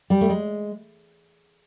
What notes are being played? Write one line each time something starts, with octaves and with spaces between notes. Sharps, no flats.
G3
A3
G#3